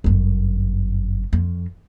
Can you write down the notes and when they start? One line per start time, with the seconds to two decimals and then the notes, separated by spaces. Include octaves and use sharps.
0.04 G1 F#2
1.33 F2